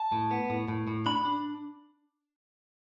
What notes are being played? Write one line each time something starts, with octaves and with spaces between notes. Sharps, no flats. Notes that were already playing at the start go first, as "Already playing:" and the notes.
Already playing: A5
A2
B3
A2
A2
A2
D4 B5
D4